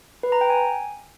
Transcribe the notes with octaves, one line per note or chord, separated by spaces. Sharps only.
B4
A#5
G5
G#5